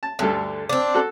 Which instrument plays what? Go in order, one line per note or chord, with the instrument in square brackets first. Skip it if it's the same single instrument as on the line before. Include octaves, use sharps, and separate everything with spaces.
[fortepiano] A5
[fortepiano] D2 G2 A4 [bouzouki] D3
[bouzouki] C4 D4
[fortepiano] F#4 A4